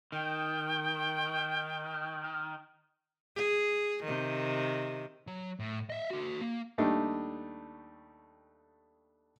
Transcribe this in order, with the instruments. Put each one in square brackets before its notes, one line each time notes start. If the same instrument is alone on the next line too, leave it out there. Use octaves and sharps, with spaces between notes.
[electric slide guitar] D#3 [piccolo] G5
[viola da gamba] G#4
C3 D#3
[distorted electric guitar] F#3
A2
D#5 E5
F#4 A4
A#3
[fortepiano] D#2 G3 A3 D4 D#4